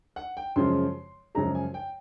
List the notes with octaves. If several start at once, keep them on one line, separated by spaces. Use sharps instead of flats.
F#5
G5
F#2 C#3 F3 G#3 C6
F#2 C#3 F3 G#3 A#5
G#5
G5